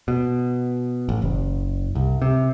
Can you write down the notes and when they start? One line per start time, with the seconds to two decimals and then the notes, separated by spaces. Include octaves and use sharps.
0.08 B2
1.09 A1
1.22 F#1
1.95 C2
2.22 C3